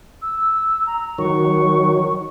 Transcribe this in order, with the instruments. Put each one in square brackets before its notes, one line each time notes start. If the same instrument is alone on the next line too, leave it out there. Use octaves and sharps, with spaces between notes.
[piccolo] E6
A#5
[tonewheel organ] D#3 F#3 [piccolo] C#6